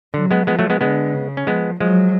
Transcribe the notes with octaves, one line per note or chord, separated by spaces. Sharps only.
D3 F#3
G#3 B3
F3 G#3 B3
F#3 A3
G#3 B3
D3 G#3 B3
C#3
C#4
F3 G#3 B3
F3 F#3 G#3